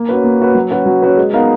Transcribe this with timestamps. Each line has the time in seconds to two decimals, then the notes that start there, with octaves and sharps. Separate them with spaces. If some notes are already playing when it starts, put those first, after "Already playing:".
Already playing: A#3
0.09 C#4 F#4 B4
0.24 A#3
0.40 C#4 F#4 B4
0.55 F#3
0.71 C#4 F#4 B4
0.86 F#3
1.02 C#4 F#4 B4
1.17 G#3
1.33 B3 D#4 A#4 F5